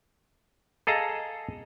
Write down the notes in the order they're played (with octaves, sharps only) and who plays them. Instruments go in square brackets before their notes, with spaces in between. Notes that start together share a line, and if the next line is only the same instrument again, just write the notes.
[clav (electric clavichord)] G#4 A4 D#5 F5 A#5